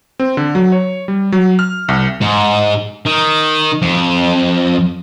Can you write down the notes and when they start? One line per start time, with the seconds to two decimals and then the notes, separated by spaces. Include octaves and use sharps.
0.20 C4
0.37 D3
0.55 F#3
0.72 C#5
1.08 G3
1.32 F#3
1.59 F6
1.88 C2
2.22 G#2
3.06 D#3
3.82 F2